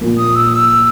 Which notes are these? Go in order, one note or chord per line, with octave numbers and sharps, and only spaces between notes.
A#2 F3 A#3
D#6
E6
E6